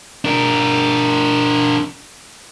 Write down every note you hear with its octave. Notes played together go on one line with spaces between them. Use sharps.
D4 A#4